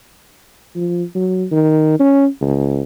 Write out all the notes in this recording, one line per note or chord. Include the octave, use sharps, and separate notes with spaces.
F3
F#3
D#3
C#4
C#2